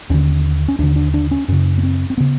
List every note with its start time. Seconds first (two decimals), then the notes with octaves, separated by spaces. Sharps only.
0.10 D#2 D3 C#4
0.68 C#4
0.79 D#2 D3 D4
0.96 D4
1.14 D4
1.31 C#4
1.48 F#2 C#3 C#4
1.78 B3
1.83 C4
2.10 C4
2.18 C#3 B3